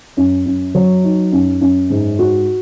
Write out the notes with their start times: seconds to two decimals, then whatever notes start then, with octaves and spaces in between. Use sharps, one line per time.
0.17 F#2
0.46 F#2
0.75 F#3
1.04 D#4
1.32 F#2
1.61 F#2
1.90 G#2
2.19 F#4